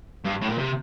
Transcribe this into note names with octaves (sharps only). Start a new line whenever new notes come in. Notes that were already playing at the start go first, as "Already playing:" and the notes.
G2
A2
A#2
C3